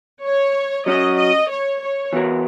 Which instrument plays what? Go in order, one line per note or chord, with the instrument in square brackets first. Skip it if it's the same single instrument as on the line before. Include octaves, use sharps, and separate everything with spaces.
[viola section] C#5
[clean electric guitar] F#3 C#4 F#4 [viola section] D#5
[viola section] D#5
C#5
C#5
[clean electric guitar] E3 B3 F#4 A#4